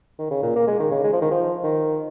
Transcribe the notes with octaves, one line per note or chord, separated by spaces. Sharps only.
D#3
C#3
A#2
A#3
G#3
D#3
C#3
G#3
F3
D#3
F3
D#3